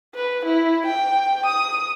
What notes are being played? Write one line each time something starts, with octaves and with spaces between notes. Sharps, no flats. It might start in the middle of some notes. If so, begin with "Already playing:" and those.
B4
E4
G5
D#6